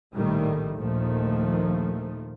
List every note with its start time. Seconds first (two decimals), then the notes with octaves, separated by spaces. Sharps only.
0.15 A#1 A2 D#3 G3 A3
0.75 A#1 D#2 D#3 F3 A3